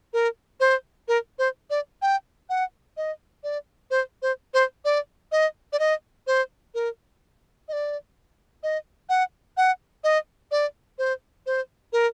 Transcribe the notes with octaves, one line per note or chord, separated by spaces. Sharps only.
A#4
C5
A#4
C5
D5
G5
F#5
D#5
D5
C5
C5
C5
D5
D#5
D5
D#5
C5
A#4
D#5
D5
D#5
F#5
F#5
D#5
D5
C5
C5
A#4